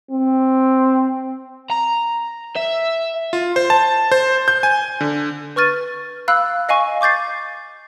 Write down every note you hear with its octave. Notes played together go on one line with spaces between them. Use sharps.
C4
A#5
E5
F4
C5
A5
C5
G6
G#5
D3
B4 C#6 F6 A6 D#7
F5 B5 E6 F#6
D#5 F5 G#5 C#6
C#6 D6 G6 A6 C7